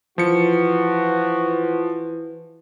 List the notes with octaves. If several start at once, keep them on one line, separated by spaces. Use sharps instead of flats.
E3 F3 F#4 C#7